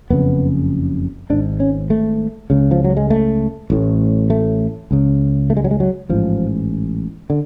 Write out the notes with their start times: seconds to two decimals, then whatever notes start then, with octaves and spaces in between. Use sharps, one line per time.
0.10 F#1 F2 C#3 B3
1.30 G#1 G#2 D4
1.60 C#4
1.90 A3
2.50 C#2 C#3
2.71 F3
2.84 F#3
2.97 G#3
3.10 A3
3.70 A1 A2
4.30 A3
4.91 C#2 C#3
5.50 A3
5.57 G#3
5.64 F#3
5.71 G#3
5.80 F#3
6.09 A1 G#2 F3
7.30 D3